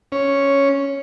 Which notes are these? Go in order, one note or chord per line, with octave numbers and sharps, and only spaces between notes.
C#4